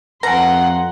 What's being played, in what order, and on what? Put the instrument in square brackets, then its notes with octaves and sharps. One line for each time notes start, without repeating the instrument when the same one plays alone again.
[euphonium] F2 [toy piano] B4 G#5 [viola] F#5 C6 [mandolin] A#5